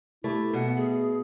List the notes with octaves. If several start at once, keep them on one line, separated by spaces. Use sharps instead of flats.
A3 E4 G4
B2 A3 F#5
G#4